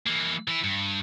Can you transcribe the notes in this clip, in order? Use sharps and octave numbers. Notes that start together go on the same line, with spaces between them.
E3 A#3
E3 E4
G2